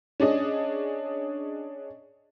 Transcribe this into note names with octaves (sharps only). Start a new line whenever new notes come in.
C#4 D4 G#4 D#5